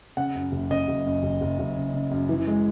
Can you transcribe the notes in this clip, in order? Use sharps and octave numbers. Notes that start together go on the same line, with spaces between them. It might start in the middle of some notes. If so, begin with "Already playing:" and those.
C#3 F#5
F#2
F#1
C#3 D#5
F#1
F#2
F#1
F#1
F#1
C#3
C#3
F#2
E3
G#3